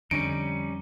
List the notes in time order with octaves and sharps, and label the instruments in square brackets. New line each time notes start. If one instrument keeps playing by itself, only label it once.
[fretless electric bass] F2 [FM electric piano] D3 [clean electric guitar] G3 C#4 D#4 [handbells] D7